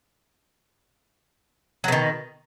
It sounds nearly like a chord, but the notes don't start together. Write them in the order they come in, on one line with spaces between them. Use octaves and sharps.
F#3 B2 D#3